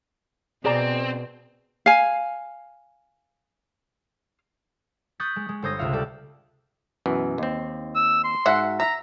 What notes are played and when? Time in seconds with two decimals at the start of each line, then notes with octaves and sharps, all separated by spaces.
0.65 B2 C4 G#4 D5 A#5
1.86 F5 G#5
5.20 C#6 D#6 F#6 G6 A6 B6
5.36 G#3
5.49 G#3
5.62 G1 A4 C5 C#5 D#6 A#6
5.79 C#2 C3 F4 E5 F5 C#7
5.92 G3 G4 A4 D5
7.06 F#2 B2 E3
7.38 D#2 C4
7.95 E6
8.24 C6
8.46 G#2 F#4 E5 F#5
8.80 E5 A#5